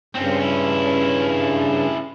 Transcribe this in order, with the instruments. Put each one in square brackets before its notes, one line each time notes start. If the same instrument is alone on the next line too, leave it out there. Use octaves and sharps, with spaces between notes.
[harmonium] G2 C#3 [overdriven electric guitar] C4 C#4
[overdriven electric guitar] C#4 E4